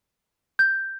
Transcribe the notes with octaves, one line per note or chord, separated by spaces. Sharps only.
G6